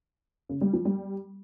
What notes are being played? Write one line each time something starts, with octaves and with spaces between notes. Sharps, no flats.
C#3
G3
F3
G3